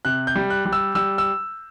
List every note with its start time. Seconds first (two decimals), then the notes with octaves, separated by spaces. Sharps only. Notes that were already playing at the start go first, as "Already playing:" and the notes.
0.05 C3 F#6
0.27 G6
0.36 G3
0.50 F#6
0.66 G3
0.73 E6
0.95 G3 E6
1.18 E6